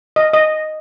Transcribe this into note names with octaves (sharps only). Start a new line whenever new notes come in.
D#5
D#5